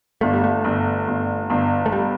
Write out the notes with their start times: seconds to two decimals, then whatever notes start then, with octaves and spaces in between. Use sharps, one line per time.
0.21 G1 A3
0.33 G3
0.44 A3
0.64 G1
1.07 G1
1.50 G1
1.86 A3
1.92 G3